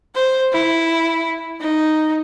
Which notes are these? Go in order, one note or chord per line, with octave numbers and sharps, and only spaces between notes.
C5
E4
D#4